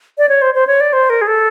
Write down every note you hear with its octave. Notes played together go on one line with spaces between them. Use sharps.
D5
C#5
C5
C5
C#5
D5
C5
A#4
G#4
A4